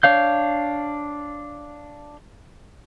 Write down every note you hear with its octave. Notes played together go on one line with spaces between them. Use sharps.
D4 C#5 F5 G6